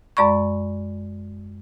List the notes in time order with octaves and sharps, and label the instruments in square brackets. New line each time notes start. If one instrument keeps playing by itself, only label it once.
[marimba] F#2 G#3 D5 B5 C#6